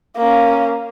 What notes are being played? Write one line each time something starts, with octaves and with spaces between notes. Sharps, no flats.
A#3 C#4